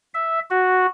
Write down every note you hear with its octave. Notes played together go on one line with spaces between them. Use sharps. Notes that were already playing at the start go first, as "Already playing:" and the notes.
E5
F#4